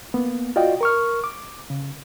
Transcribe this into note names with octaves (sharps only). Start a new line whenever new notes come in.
A#3 B3
F4 F#4 D5 D#5 G5
A#4 C#6 F6
D6
C#3